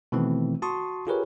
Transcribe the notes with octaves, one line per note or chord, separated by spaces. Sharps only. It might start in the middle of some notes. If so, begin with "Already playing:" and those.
B2 D#3 E3 A3 C4
F#4 A5 C6 C#6 D#6
F4 G4 G#4 A#4 B4 C#5